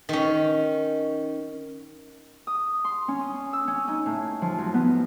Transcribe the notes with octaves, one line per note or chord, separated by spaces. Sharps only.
D#3 C#4
D#6
C6
C#4
D#6
E6
C#4
D#4
A2
F3
F#2
B3